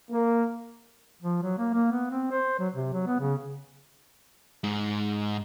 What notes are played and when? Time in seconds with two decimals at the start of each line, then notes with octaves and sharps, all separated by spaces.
0.11 A#3
1.22 F3
1.43 F#3
1.59 A#3
1.74 A#3
1.92 B3
2.11 C4
2.31 C5
2.60 F#3
2.75 C3
2.93 F#3
3.07 B3
3.20 C#3
4.64 G#2